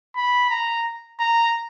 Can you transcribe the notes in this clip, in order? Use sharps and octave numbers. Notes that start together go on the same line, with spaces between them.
B5
A#5
A#5